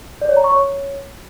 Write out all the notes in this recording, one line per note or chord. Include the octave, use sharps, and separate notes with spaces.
D5
C#5
A#5
C#6
C#5